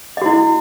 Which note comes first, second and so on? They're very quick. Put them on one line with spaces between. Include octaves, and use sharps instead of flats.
D#5 F#4 E4